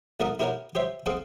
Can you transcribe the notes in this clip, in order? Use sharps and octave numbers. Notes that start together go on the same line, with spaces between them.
B1 A3 A#4 D5 F#5 D#6
E4 G4 A#4 C#5 D5 F#5
G4 C5 C#5 E5
C4 G#4 A4 D5 F5 F#5